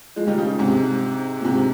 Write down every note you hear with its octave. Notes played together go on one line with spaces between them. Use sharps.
F3 G#3
D#3 G3
C#3 F3
G#2 C3
A#2
G#2 C3